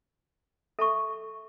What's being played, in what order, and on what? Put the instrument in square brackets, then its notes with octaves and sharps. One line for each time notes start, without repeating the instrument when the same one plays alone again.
[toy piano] A4 E5 A5 C#6